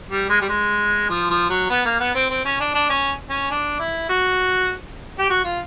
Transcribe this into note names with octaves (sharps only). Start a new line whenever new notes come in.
G3
G#3
G3
G#3
F3
F3
F#3
B3
A#3
B3
C4
C4
C#4
D4
D4
C#4
C#4
D4
E4
F#4
G4
F#4
F4